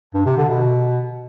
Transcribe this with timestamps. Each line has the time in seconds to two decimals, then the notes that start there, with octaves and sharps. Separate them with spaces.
0.14 G2
0.26 C3
0.37 D3
0.49 B2